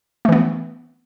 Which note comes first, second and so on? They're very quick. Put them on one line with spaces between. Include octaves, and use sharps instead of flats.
A3 E3 B3